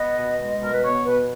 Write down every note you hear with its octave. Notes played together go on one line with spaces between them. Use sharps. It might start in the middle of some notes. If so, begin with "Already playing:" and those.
Already playing: B3 D#5
B2
G#3
B2 A#4
B4
B3 C#5
B2 B4